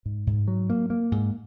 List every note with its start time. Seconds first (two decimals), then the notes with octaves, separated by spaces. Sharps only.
0.06 G#2
0.27 G#2
0.48 F#3
0.70 A#3
0.90 A#3
1.12 G#2